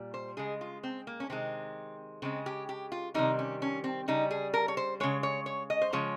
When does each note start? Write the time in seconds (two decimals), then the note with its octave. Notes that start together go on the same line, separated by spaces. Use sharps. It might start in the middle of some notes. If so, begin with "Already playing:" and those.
Already playing: A#2 G3
0.14 C5
0.37 C#3 G#3 G#4
0.61 F4
0.83 C4
1.07 A#3
1.20 C#4
1.30 C3 D#3 G#3 C4
2.22 C#3 G#3 C4
2.46 G4
2.69 G4
2.92 F4
3.14 C3 D#3 G3 D#4
3.39 C#4
3.62 C#4
3.84 C4
4.08 C#3 G3 D#4
4.31 G#4
4.54 A#4
4.68 C#5
4.77 C5
5.00 C#3 G#3 C#5
5.23 C#5
5.46 C#5
5.70 D#5
5.82 C5
5.93 C#3 F3 G#3 C#5